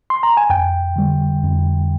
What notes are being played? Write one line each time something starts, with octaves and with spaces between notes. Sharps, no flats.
C6
A#5
G#5
F2 G5
D3 G3
F2